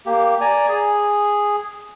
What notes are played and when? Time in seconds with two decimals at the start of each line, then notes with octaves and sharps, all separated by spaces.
0.06 A#3 G4
0.41 D5 G#5 A#5
0.68 G#4